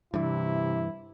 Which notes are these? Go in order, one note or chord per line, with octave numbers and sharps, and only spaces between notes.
G2 C3 E3 E4